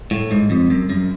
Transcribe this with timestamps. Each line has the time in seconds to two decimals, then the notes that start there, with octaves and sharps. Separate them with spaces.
0.11 A2
0.31 G#2
0.50 F2
0.70 F#2
0.89 F#2